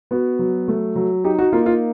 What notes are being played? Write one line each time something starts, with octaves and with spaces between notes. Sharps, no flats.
B3 F#4
F#3
A3
F#3
D#4 G4
F#4
A#3 F4
F4